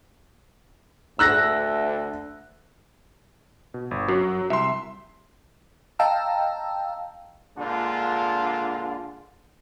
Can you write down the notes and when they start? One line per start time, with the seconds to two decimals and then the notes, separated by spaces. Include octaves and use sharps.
1.19 D2 E6 F#6 A#6
3.74 B2
3.91 G1
4.08 F#2 F#3
4.50 C2 E5 C6
5.99 D#5 F5 G5 A5 A#5 E6
7.58 A#2 D3 G#3 D4 F4